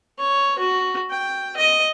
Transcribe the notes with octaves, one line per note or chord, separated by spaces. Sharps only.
C#5
F#4
G5
D#5